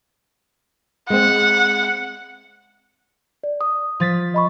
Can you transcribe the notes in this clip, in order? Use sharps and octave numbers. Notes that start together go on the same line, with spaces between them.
G#3 C4 F#5
D5
D#6
F3 A6 B6
D#5 B5 C#6